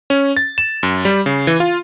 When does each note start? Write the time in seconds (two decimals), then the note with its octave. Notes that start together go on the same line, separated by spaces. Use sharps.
0.10 C#4
0.37 A6
0.58 E7
0.83 F#2
1.05 G3
1.26 C#3
1.47 E3
1.60 F4